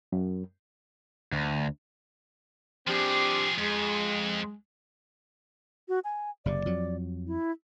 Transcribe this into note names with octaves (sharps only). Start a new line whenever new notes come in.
F#2
D2
F3 C4 D4 G4 G#4
F2 G#3
F#4
G#5
F#1 C3 D5
F2 F#3
E4